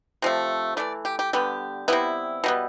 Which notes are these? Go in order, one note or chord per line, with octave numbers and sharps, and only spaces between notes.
C3 F3 A3
E3 A3 D5
G4
G4
D3 G3 B3 G4
C3 G3 B3 E4
B2 G3 B3